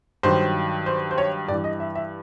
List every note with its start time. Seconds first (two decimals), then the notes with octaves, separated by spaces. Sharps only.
0.23 G2 D#3 F#3 C5
0.86 C5
1.11 C5
1.18 C#5
1.48 G2 D5
1.52 E3
1.64 D#5
1.80 E5
1.95 E5